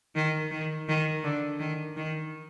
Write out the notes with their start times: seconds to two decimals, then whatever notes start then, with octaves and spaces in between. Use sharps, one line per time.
0.15 D#3
0.51 D#3
0.88 D#3
1.24 D3
1.60 D#3
1.97 D#3